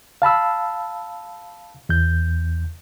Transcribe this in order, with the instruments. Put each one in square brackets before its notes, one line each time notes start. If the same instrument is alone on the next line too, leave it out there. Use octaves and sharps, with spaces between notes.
[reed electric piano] F5 A5 B5 E6
E2 G6